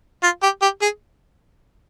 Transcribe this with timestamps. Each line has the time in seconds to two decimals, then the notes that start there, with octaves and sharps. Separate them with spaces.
0.23 F4
0.43 G4
0.62 G4
0.82 G#4